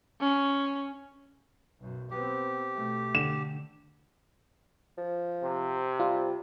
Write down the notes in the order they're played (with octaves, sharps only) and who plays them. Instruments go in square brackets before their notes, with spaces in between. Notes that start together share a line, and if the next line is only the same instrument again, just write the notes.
[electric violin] C#4
[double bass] B1 F#2
[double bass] B3 C4 [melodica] G4
[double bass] B2 A3
[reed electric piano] D3 [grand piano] E7
[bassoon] F3
[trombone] C3
[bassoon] G3 [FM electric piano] F4